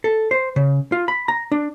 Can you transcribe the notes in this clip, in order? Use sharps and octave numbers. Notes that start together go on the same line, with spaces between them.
A4
C5
C#3
F4
B5
A#5
D4